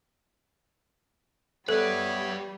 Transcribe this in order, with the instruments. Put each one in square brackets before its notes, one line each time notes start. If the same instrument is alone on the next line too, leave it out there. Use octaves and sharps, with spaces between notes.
[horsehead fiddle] G3 [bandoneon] B3 C#5 E5 [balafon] A4 [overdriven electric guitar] B4 D5